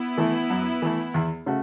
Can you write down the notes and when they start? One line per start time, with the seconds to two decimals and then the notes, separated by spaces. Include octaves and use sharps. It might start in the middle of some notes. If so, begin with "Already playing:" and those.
Already playing: B3 E4
0.18 E3 A3
0.50 F#2
0.82 E3 A3
1.14 E2
1.46 C#3 A3 F#4